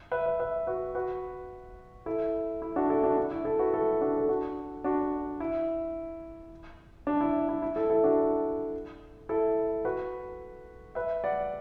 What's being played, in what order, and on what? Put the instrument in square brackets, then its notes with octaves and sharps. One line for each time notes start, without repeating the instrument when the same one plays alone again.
[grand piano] B4 E5
B4 E5
B4 E5
F#4 B4
F#4 B4
E4 A4
E4
D4 F#4
E4 A4
D4 F#4
D4
E4
E4 A4
F#4 B4
E4 A4
D4 F#4
A4
D4 F#4
D4 F#4
E4
D4
E4
E4
E4
E4 A4
E4 A4
D4 F#4
E4 A4
F#4 B4
B4 E5
D5 F#5